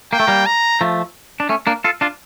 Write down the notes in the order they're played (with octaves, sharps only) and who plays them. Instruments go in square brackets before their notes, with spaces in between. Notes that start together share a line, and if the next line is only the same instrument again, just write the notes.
[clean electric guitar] A#3 [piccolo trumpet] G5
[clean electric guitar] A3
G3 A#3
[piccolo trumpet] A#5
[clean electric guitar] F3 A3
D4
A3 C#4
A#3 D4
F4 A4
D4 F4